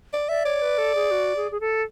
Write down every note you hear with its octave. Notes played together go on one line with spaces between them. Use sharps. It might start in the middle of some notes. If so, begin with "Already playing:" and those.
D5
D5 E5
C#5 D5
B4
A4
G#4
F#4
G#4
G#4
A4